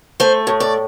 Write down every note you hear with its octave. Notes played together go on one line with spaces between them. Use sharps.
A3 C5
A2
D5